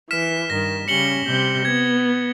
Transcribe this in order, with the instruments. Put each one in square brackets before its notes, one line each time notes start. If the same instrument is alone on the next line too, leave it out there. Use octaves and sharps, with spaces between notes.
[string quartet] E3 [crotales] F6 B6 E7
[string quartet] G2 D#3 [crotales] A#6
[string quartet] C#3 G3 C#4 [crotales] C#7 F#7 G7
[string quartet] C3 G3 G6
[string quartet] B3 [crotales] G#6